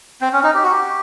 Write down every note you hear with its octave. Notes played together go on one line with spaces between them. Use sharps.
C4
C#4
D#4
G4
F#4
G4